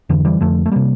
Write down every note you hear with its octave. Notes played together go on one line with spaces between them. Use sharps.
F2 D3 E3
E3 G3
F2 D3 F3 A3
A3
C3 G3 A#3